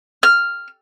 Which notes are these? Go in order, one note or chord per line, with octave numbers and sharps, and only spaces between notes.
F6